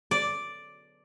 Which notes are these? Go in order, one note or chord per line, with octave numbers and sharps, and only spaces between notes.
D5